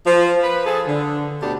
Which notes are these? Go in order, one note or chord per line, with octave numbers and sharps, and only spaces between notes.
F3
B4
F3 G#4 A4
D3
D2 B2 B3 D4 G4 A4